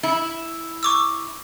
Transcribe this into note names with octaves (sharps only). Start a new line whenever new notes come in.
E4
C#6 D6 E6